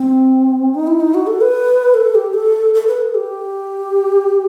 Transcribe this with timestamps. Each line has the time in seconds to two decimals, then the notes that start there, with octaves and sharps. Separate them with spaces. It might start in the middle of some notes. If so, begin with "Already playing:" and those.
Already playing: C4
0.75 D#4
0.87 E4
1.00 D#4
1.14 F#4
1.27 A4
1.41 B4
1.94 A4
2.15 G4
2.34 A4
2.74 A4
2.87 B4
3.02 A4
3.15 G4